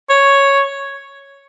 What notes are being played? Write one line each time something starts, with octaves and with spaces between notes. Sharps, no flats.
C#5